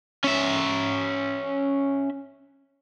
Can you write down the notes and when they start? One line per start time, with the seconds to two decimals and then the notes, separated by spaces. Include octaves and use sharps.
0.24 C#4 E5